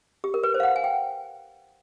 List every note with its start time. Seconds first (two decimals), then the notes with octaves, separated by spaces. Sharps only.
0.24 G4
0.34 A#4
0.43 B4
0.54 C5
0.60 F5
0.63 F#5
0.76 G#5
0.84 G5